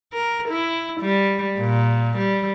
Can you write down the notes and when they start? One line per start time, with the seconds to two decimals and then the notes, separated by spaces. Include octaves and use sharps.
0.13 A#4
0.49 E4
1.01 G3
1.58 A#2
2.18 G3